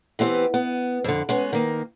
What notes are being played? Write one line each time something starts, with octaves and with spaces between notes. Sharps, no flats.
E3 B3 C4 E4 G4
B3
F2 D3
G#3 B3 C#4
D#3 A#3